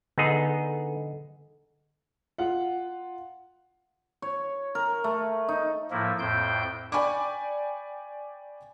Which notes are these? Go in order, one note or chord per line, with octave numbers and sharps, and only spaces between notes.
D3 B3 D#4 G#4
F4 F#5
C#5
A#4
A3
D#4
A2 F3 A#3 E4
F2 A2 C5 G5 G6
D5 G5 G#5 B5 C#6 D6